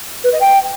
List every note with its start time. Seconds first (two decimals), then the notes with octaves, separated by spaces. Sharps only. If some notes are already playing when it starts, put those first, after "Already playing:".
0.24 B4
0.32 D#5
0.41 G5